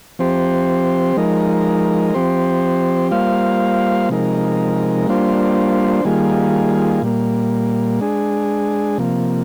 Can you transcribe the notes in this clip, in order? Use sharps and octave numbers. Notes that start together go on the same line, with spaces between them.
F3 C4 G4 C5
F3 G#3 D#4 A#4
F3 C4 G4 C5
G3 A#3 F4 C5 F5
C3 F3 G#3 D#4 A#4
G3 A#3 D4 F4 C5
D#3 G3 A#3 F4 G#4
A#2 G3 A#3
G#3 D4 G#4
C3 F3 A#3